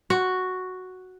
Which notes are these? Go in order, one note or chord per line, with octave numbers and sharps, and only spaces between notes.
F#4